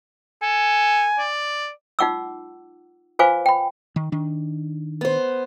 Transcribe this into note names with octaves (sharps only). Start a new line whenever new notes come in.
A4 G#5
D5
D#4 F4 F#5 D6 E6
F4 B4 C5 F5 G#5 D6
G5 B5
D#3
D#3 D4
B3 C5